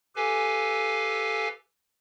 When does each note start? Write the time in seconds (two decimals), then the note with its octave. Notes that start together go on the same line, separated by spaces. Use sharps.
0.16 G4 A4 B4 F5 G#5